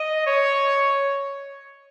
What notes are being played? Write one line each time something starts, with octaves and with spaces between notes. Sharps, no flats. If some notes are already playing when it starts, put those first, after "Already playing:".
Already playing: D#5
C#5